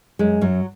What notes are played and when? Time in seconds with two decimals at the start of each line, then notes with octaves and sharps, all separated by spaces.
0.19 F#2 G#3
0.41 F#2 F#3